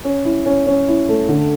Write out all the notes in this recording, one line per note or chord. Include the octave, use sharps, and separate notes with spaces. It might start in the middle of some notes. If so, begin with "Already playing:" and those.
C#4
E4
C#4
C#4
E4
A3
D3